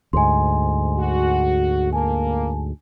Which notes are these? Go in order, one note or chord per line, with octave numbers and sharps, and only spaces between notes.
D2 G#2 G#5 C6
F#4
A#3 G#5 A5